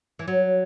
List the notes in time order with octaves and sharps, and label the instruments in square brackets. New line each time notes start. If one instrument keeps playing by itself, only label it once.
[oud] E3
F#3